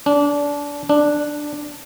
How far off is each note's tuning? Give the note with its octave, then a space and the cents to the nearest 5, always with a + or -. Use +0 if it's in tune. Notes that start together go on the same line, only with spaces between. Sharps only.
D4 -25
D4 +5